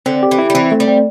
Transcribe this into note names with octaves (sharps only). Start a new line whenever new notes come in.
D3 C4
G4
E3
E4
G3
E3 C4
A3
G3
C4